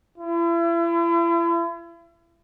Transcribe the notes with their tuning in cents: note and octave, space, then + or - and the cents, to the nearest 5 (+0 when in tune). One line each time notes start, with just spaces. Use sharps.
E4 +40